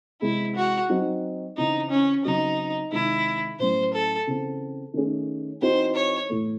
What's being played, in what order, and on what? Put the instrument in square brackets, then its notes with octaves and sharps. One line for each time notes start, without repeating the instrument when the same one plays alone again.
[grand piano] C3 E3 G#3 [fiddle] E4
[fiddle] F#4
[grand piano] F#3 C4 D#4 F#4
[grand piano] C#3 E3 C4 [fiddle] D#4
[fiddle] C#4
[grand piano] C#3 F#3 C4 F#4 [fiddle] D#4
[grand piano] C3 D#3 G#3 D#4 [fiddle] E4
[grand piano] A2 F#3 C#4 E4 [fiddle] C5
[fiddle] A4
[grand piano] C#3 E3 C4
D#3 A3 C#4 G#4
[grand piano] E3 C4 D#4 F#4 [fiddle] C5
[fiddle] C#5
[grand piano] A2 E3 A3